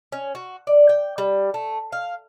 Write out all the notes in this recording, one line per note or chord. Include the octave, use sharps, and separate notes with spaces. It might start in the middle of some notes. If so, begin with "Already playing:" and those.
C#4
F#4
D5
G5
G3
A3
F5